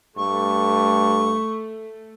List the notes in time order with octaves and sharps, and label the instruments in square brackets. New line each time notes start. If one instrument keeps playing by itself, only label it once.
[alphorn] G2 [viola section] A3 [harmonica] C#6